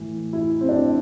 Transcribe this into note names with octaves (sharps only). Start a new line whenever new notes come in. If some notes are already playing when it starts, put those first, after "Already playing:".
Already playing: A2 E3
E4
C4
D4
C4